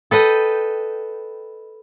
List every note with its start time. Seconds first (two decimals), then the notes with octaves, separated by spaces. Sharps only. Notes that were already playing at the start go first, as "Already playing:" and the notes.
0.11 A4 B4 D#5 G5